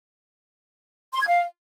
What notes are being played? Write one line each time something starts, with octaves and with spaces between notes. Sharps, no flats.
C6
G#6
F5